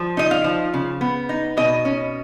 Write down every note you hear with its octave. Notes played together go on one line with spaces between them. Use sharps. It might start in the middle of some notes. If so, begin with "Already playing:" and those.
Already playing: F3
D#4 D#5
F5
F3
C#3
B3
D#4
B2 D#5
C#4